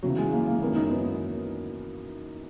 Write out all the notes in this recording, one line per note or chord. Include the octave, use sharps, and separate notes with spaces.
C#3 E3 F#3 B3
G#3
A#3
A#3
F#2 D#3 A#3 B3 E4 A#4
D#4
B3